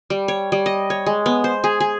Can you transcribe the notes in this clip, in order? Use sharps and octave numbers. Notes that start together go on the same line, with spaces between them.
G3
C#5
G3
D#5
C#5
G#3
B3
C5
G#4
G#4